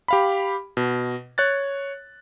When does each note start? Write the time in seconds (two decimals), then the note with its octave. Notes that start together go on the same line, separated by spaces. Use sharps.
0.08 G4 F5 B5
0.77 B2
1.38 C#5 F#6 A6